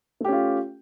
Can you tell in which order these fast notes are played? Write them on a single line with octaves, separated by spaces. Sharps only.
A3 G4 C#4 F4